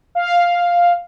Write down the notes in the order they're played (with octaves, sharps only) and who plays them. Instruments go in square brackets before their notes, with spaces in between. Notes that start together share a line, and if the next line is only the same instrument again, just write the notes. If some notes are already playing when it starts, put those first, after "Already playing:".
[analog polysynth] F5